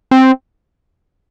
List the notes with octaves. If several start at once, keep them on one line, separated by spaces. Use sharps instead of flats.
C4